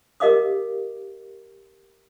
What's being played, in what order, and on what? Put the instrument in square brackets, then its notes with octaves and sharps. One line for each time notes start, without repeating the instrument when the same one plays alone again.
[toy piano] G4 A#4 D#5 F5 D6 D#6